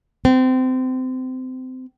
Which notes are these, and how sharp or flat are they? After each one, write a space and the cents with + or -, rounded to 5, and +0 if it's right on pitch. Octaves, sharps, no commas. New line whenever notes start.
C4 -25